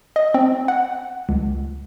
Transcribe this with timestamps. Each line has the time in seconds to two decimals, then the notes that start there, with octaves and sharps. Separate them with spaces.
0.16 D#5
0.34 C4
0.68 F#5
1.29 C#2